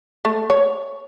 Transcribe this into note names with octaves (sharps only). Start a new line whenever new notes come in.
A3
C#5